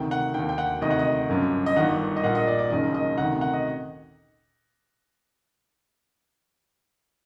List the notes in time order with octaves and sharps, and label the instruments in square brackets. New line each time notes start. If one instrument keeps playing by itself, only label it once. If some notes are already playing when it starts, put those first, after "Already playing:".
Already playing: [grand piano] D2 C3 D#3 G5
F#5
D#2 D3 G5
G5
F#5
D2 C3 D#3 D#5
F#5
D#5
G1 F#2 D3
D#5
G1 G2 D#3 F#5
D#5
A#1 A#2 F#5
D#5
D5
D5
F#1 F#2 D#3 D#5
D#5
D2 C3 D#3 F#5
F#5
D#5